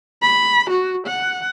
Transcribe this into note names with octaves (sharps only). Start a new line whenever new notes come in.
B5
F#4
F#5